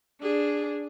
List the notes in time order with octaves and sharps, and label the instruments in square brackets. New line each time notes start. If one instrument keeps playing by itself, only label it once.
[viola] D4 G#4